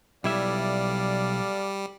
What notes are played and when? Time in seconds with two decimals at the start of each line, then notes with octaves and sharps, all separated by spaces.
0.24 B1 G3 E4 A4 D5 E5 F5